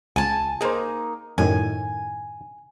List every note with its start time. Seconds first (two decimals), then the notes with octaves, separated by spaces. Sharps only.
0.16 C#2 G#5 A5
0.61 A#3 D#4 G#4 C5
1.38 F#2 A2 D#3 G#5